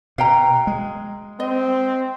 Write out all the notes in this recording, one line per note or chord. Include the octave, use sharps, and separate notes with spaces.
B2 F5 G5 A#5
G#3
C4 D#5